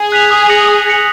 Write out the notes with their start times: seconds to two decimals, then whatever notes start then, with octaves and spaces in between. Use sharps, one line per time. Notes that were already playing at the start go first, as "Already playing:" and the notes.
Already playing: G#4
0.12 F#6 B6 F7
0.31 D#6
0.49 A#6 C#7 F#7
0.69 D#6
0.87 A#6 C#7 F#7